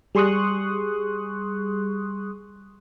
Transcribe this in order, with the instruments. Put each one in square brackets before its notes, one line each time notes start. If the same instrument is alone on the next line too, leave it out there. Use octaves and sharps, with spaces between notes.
[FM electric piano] G3 G#4 C6 C#6 D#6 F#6